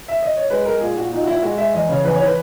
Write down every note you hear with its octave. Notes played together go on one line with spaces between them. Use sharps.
E5
D#5
C#5
G#3 B4
G#3 A#4
A#2 G#4
A#2 F#4
A#2 D#4
F#4
A#2 E4
G#3 F#4
G#3 E5
E2 D#5
C#3 C#5
E2 B4
C#5
E3
B4